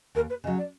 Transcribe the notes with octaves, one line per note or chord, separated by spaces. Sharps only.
D#2 A#4
B4
C#3 F#3 D#5
D5